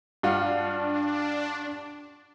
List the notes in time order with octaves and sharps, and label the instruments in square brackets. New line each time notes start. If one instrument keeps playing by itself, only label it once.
[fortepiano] G2 F4 F#5 [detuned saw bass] D4